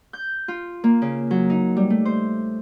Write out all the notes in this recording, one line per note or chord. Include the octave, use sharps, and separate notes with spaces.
G6
F4
A#3
C#3
F#3
D#4
G3
A3
C5